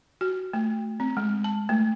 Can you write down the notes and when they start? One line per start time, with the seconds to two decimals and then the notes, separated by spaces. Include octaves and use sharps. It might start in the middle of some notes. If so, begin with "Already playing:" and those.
0.21 F#4
0.53 A3
1.00 C4
1.17 G#3
1.44 A5
1.69 A3